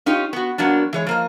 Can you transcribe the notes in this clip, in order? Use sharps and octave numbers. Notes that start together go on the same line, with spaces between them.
C#4 D#4 F4 G4
B3 F#4
F#3 A#3 B3 D4
E3 G#3 C#5
F3 A#3 D#5